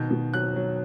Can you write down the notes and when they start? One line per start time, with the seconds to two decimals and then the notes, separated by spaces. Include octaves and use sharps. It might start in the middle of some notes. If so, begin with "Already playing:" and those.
Already playing: B2 D#3 G6
0.11 B2
0.34 F#3 F#6
0.56 F#3